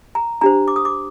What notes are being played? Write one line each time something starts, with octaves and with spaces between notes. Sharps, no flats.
A#5
D4 G4 C5 A#5
D6
D#6
D6